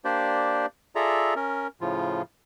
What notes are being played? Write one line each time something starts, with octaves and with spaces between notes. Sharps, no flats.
A#3 D4 G4 C5 D5
F4 G#4 A4 D5 E5 A#5
C#4 A#4
A2 C#3 F3 F4